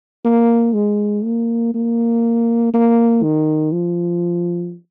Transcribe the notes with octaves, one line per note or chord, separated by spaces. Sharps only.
A#3
G#3
A#3
A#3
A#3
D#3
F3